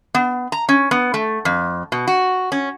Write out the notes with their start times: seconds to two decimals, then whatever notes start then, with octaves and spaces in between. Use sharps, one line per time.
0.15 B3
0.52 A#5
0.69 C#4
0.91 B3
1.14 A3
1.45 F2
1.92 B2
2.07 F#4
2.52 C#4